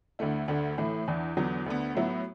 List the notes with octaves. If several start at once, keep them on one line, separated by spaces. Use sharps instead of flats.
D2 D3 A3 E4
D2 D3 A3
A2 E3 A3 E4
E2 E3 D4
E2 D3 F#3 B3
D2 D3 B3
A2 F#3 B3 E4